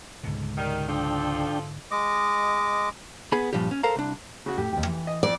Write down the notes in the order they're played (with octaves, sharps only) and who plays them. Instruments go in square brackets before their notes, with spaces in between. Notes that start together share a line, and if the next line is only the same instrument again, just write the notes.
[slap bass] C#2 B2 [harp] G#2 D3
[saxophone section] D#3 G3
[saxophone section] F3 A4 [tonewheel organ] D4 G5
[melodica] G#3 D#5 D6
[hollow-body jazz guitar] B3 G#4 B5
G2 A#2 F3 G3 G4
C#4
A4 A#4 C5 F5 A#5
C2 D4
[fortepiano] C#3 F#4
[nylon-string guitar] A2 [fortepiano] G4
[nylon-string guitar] D#2 G5
E3
[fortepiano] D#5
[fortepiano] F2 [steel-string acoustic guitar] D5